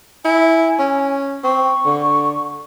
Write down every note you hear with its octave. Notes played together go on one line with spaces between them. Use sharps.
E4 G#5
C#4
C4 C#6
D3